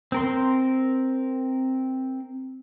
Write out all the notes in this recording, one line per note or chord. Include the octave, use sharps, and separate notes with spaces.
C4 A#4 C6